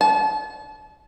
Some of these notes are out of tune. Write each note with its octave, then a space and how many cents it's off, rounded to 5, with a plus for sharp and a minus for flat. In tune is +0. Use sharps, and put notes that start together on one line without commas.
A5 -35